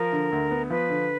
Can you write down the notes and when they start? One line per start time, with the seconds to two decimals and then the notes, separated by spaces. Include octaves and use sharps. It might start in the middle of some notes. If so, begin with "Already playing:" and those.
Already playing: F3 A#4
0.12 D3
0.32 D2
0.51 B3
0.70 F3 B4
0.89 D3